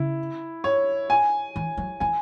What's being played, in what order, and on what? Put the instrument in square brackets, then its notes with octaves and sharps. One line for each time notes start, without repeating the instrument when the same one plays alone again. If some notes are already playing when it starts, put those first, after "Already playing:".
Already playing: [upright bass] C#3 [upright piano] E4
[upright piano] C#5
G#5
[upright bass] E3
F#3
[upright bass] E3 [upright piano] G#5